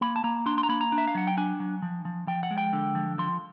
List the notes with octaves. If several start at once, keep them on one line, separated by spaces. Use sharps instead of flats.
A#3 B5
A5
A#3 A#5
D4 C6
C6
A#5
A#3 B5
A#5
D4
E5
F5
F#3 F#5
G5
D4 G#5
F#3
F3
F3
F3 G5
F#5
G#3
G5
D3
F3
F3 C6